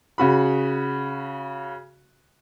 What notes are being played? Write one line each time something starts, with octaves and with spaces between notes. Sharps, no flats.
C#3 F#4 B5